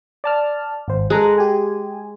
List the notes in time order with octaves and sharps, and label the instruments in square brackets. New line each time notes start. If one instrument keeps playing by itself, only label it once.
[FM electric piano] D5 A5 F6
G#1 C5
[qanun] G#3 [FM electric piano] A4 A#5 F#6
[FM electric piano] G4 G#5